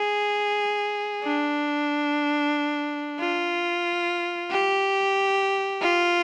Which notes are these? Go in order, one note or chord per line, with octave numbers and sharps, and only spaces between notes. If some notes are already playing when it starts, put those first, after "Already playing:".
Already playing: G#4
D4
F4
G4
F4